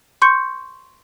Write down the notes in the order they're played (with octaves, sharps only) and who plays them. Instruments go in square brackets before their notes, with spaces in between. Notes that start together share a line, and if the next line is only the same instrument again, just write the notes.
[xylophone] C6 C#6 G6 C#7